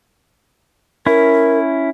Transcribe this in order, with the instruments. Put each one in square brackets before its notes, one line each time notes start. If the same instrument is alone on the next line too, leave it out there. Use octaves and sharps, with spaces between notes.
[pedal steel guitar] C#4 E4 [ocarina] A#4